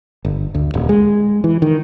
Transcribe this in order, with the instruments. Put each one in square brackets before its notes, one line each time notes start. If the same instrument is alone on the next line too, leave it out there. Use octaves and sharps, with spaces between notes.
[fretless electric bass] G1
D2
D#1
G#3
E3
D#3